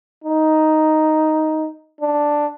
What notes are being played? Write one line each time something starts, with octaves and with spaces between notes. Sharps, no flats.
D#4
D4